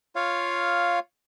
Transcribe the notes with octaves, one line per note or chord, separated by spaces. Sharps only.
F4 C#5 F5